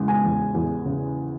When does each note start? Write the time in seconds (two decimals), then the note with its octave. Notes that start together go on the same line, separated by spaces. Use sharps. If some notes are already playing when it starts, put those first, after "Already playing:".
Already playing: E2 C#3 G#3
0.08 G#5
0.23 E2
0.54 E2
0.85 C#3